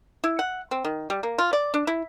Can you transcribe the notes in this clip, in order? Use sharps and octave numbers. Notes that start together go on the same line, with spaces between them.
E4
F#5
C4
D#3
G3
A#3
F4
D5
D4
E4